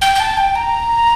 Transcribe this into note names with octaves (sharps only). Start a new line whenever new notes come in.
G5
G5
A5
G5
A#5